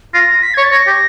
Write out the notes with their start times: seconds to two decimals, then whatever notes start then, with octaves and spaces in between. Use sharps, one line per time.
0.14 F4 A#6
0.43 B6
0.54 C#5 G#6
0.64 A6
0.72 C#5 A#6
0.87 G4